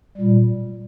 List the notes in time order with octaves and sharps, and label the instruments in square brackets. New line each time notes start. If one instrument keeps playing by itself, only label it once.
[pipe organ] A#2 G3